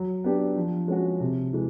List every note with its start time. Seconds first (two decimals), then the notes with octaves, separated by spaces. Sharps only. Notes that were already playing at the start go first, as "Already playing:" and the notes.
Already playing: F#3
0.24 B3 D4 G4
0.56 F3
0.88 G#3 C#4 F#4
1.20 C3
1.53 E3 G#3